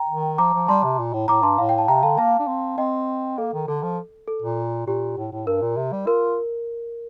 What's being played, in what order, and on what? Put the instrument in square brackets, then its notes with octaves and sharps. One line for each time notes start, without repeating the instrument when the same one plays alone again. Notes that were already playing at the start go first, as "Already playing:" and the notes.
Already playing: [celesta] G5 A#5
[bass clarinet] D#3
[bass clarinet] F3 [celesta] A#5 D6
[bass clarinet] F3
[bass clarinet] G3 [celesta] A5 C6
[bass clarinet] C3
A#2
A2
[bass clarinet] A2 [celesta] A#5 D6
[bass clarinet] G2 [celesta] A5 C6
[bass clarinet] A2 [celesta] F5
[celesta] G5
A5
[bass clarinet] C3 [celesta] G5 A#5
[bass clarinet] D3 [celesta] F5 A5
[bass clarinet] A#3 [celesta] F5 A5
[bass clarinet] D4
C4
[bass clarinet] C4 [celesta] D#5 G5
[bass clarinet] A#3 [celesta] A4
[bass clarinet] D#3
[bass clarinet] D3 [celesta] A4
[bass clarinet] F3
[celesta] A4
[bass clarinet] A#2
[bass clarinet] A#2 [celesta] G4
[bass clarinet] A2
A2
[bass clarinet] G2 [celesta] A#4
[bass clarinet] A#2
C3
G3
[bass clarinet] F4 [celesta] A#4